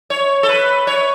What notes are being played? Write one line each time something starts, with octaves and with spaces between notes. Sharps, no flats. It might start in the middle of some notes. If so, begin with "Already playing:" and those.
C#5
A4
B4
C#5